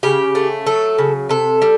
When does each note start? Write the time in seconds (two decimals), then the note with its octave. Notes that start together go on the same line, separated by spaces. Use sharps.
0.03 C#3 G4
0.35 A3
0.66 F#3 A4
0.98 C#3
1.29 C3 A4
1.62 G3